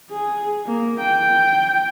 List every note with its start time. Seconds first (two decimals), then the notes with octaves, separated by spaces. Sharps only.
0.10 G#4
0.66 A#3
1.00 G5